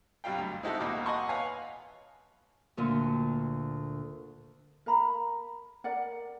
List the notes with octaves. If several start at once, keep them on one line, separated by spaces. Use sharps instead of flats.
G2 B2 F#3 G3 F5 G5
D2
G#3 C4 D#4 E4 F#4 A4
A#1 D#2 B2 A#3 F#4 D6
D#5 F#5 G#5 A5 C6 C#6
B4 C#5 F5 G#5 A5
D2 A#2 D3
A#4 F5 A#5 B5
A#4 D5 F#5